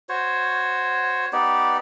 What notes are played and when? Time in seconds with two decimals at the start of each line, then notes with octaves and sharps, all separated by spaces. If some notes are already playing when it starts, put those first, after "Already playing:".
0.09 F#4 C5 C#5
1.33 B3 D#4 G4 D5